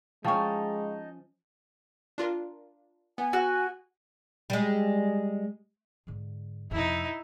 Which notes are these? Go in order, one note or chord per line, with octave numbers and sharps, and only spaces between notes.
F3 G#3 C#4 D#4 F5 G5 A5 C#6
D4 F4 A#4
B3 G#5
F#4
G3 G#3
G#2 D3
F2 C3 D#4 E4